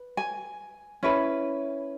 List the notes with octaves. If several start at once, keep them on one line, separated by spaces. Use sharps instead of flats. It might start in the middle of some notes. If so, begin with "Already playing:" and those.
Already playing: B4
G#5
C#4 E4 B4